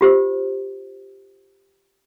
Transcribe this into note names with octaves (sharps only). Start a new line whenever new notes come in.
F4 G4 C5